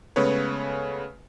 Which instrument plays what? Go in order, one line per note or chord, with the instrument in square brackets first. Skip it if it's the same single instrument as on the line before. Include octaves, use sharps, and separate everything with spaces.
[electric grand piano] C#3 G#3 A3 B3 B4 C#5